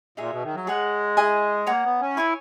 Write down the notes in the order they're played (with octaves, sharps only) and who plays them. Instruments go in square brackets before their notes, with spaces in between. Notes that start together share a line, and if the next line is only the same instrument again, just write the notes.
[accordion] A#2 [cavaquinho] D#4 G#4 C#5 E5
[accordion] B2
D#3
F#3
[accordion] G#3 [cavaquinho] G#4 C#5 F#5 A#5
[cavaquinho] E4 G#4 D#5 G#5
[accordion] A#3 [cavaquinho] C#5 F#5 A#5
[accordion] B3
C#4
[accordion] E4 [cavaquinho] C#5 G#5 C#6